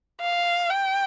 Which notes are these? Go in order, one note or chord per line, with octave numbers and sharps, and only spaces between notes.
F5
G5